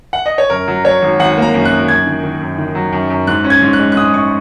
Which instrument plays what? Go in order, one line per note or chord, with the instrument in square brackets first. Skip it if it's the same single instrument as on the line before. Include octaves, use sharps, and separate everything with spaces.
[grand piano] F#5
D#5
C#5
F#2 A#4
F#3
F#3 C#5
G#1
G#1 F#5
A#3
A#5
F#2
F#6
G#1
F#2 G#6
D#3
D#3
F#2
D#3
F#3
F#2
F#2
G#2 F#6
C#4
G#6
G#2
F#6
G#3
F#6
G#2 D#6
G#2 C#6